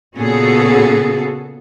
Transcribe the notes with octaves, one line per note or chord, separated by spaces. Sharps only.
A#2 C#3 B3 F#4 G#4 A4